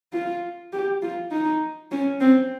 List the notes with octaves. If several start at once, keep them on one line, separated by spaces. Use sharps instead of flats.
F4
G4
F4
D#4
C#4
C4